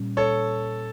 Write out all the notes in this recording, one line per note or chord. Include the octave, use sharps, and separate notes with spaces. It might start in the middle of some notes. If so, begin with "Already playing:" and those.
Already playing: A#2 G3 C#4
A4 C#5